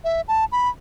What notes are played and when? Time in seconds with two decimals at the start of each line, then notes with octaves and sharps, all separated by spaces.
0.04 E5
0.28 A5
0.52 B5